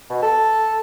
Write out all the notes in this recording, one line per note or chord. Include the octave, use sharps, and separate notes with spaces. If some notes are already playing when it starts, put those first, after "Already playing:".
B2
A4